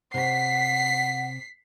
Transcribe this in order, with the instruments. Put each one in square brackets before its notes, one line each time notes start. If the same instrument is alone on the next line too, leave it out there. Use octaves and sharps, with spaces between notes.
[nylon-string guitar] C3 C#5 [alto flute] F#5 [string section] B6 C7